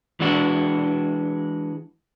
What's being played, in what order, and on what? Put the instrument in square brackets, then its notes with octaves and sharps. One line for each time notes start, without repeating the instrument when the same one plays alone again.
[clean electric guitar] E3 G#3 D4 F#4